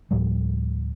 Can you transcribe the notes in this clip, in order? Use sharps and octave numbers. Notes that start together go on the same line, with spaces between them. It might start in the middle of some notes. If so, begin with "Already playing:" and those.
D2 A2 F3 G3